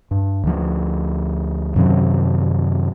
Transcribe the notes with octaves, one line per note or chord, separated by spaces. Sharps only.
G2
D2 F3
F#2 C3 D#3 F#3